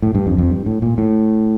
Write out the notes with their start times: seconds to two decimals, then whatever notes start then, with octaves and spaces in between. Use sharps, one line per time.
0.02 A2
0.15 G2
0.27 F2
0.38 F2
0.50 G2
0.66 A2
0.82 A#2
0.98 A2